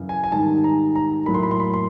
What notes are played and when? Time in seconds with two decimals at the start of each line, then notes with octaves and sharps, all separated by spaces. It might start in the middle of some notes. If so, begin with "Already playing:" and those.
Already playing: F#2 C#3 E3
0.09 G#5
0.24 G#5
0.32 G#2 D#3 G3 A5
0.64 A#5
0.95 A#5
1.26 A2 F#3 A#3 B5
1.34 C6
1.43 B5
1.51 C6
1.60 B5
1.74 C6